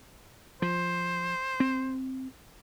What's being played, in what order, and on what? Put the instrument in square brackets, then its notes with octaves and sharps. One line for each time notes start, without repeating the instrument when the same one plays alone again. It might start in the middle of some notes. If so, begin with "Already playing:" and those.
[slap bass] F3 [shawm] C5
[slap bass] C4